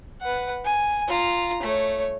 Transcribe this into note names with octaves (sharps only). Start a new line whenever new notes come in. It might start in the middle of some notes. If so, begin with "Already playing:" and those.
B4 F#5
G#5
F4 A#5
A3 C#5